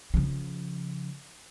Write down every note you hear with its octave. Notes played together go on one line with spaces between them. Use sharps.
C#3 F3